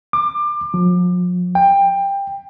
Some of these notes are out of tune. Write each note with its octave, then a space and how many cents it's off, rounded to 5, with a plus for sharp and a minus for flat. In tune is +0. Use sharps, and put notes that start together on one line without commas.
D6 +25
F3 +40
G5 +20